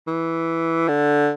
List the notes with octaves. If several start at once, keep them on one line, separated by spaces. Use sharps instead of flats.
E3
D3